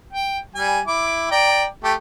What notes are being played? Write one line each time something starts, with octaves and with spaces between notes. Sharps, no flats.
G5
G3 G#5
E4 D6
D5 G5 A#5
A3 G4